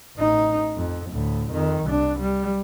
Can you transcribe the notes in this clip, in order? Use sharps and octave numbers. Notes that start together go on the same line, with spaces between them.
A1 D#4
F2
D2 A2
F2 D#3
C2 D4
G3